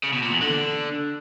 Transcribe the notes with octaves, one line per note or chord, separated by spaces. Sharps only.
C#3
B2
A#2
E2
D3